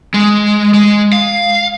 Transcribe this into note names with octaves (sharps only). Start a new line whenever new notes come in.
G#3
G#3
F5